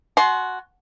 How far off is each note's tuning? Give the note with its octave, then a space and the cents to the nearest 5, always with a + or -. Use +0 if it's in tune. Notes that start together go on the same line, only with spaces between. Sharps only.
F#4 +0 G#5 +45 C6 +0